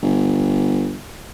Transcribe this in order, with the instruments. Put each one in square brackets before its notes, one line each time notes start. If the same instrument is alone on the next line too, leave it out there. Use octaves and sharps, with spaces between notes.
[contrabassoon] G1